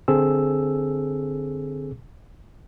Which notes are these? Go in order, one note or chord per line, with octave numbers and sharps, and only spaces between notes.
D3 C4 G#4 A4 E6